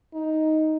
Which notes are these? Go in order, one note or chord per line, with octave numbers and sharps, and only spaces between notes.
D#4